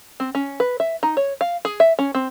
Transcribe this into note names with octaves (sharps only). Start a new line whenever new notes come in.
C4
C#4
B4
E5
D#4
C#5
F5
G#4
E5
C#4
C4